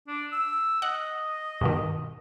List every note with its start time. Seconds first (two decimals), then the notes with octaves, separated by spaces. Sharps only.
0.07 D4
0.32 E6
0.82 D#5 F#5
1.61 G2 B2 D#3